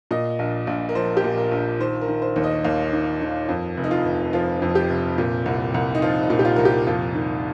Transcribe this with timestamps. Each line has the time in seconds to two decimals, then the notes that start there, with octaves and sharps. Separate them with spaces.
0.11 A#2 D#5
0.39 A#1
0.67 A#1
0.89 A#4
0.95 F3 C5
1.17 G4
1.24 A#2
1.38 A#4
1.52 A#1
1.80 D#3 C5
2.01 A#4
2.08 D#3
2.22 C5
2.36 D#2
2.44 D#5
2.65 D#2 F5
2.93 D#3
3.21 D#3
3.49 F2
3.77 F1
3.84 D#4
3.91 F4
4.05 F1
4.33 F3 F4
4.62 F2
4.75 G4
4.90 F1
5.18 A#2
5.46 C2
5.74 C2
5.95 D#4
6.02 F3 F4
6.23 D#4
6.30 A#2
6.39 G4
6.45 F4
6.56 C2 A#4
6.65 G4
6.87 F2 F4
7.15 D#3